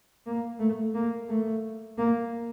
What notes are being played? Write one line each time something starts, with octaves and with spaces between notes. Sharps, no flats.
A#3
A3
A#3
A3
A#3